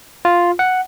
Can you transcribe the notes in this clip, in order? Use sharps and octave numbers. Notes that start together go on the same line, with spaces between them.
F4
F#5